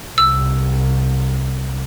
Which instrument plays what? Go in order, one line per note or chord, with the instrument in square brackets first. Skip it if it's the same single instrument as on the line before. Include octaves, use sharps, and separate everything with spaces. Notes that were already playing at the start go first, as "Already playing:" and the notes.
[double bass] C2 [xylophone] E6